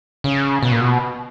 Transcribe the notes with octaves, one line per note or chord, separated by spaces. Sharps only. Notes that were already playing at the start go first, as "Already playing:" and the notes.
C#3
B2
A#2
B2